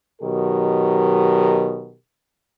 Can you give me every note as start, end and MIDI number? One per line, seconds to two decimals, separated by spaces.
0.22 1.96 47
0.22 1.96 51
0.22 1.96 54
0.22 1.96 67
0.22 1.96 70